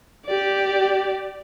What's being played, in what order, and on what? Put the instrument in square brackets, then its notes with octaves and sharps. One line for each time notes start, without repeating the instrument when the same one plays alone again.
[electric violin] G4 D5